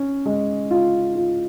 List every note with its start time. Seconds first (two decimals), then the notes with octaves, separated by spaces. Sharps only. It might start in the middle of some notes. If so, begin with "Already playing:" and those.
Already playing: C#4
0.25 G#3
0.71 F4
1.15 F4